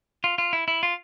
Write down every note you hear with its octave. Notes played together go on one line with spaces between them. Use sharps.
F4
F4
E4
E4
F4